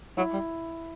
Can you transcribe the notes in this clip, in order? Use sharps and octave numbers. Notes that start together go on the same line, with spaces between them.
F#3 E4
G3